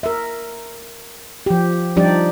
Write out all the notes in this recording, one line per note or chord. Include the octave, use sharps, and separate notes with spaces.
A#4 E5
F3 G4
F3 G3 D4 D#4 G4 D5